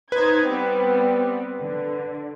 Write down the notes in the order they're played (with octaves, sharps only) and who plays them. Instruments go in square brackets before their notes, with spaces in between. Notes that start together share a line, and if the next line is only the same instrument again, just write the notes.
[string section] D#4 C5 G#6 [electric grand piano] B4
[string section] G3 B3 C4
D3